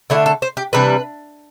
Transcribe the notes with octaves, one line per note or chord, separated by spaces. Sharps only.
D3 A3 D4 E4
A4
C5
G4
C3 E3 G3 D4 B4